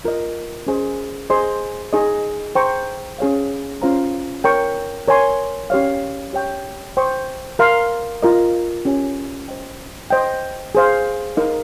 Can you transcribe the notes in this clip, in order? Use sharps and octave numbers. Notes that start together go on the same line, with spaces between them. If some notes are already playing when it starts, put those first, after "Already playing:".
F4 A#4 D#5
C#4 G#4 C5 D#5 G#5
G#4 C5 D#5 G#5 C6
D#4 G#4 D#5
C5 G5 A#5 C#6
C#4 G#4 C#5 F5
C#4 F4 C5 F5 A#5
A#4 C#5 G5 C#6
A#4 C#5 G#5 C6
C#4 G4 C#5 F5
G4 C#5 G5 C#6
C5 G5 C#6
A#4 F5 C6
F4 A#4 D#5
C#4 G4 C#5 G#5
C5 D#5 G5
C5 D#5 G5
G#4 C5 F5
D#4 A#4 F5